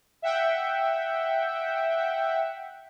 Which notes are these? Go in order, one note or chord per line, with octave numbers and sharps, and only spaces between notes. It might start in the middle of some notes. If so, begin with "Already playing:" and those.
E5 F#5 G5